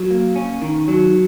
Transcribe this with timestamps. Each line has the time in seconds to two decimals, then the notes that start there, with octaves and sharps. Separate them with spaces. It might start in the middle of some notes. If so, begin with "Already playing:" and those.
Already playing: F#3
0.11 A#3
0.36 C#4
0.62 D#3
0.88 F#3